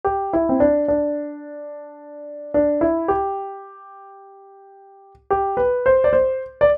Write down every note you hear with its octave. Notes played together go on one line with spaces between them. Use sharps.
G4
E4
C4
D4
D4
D4
E4
G4
G4
B4
C5
D5
C5
D5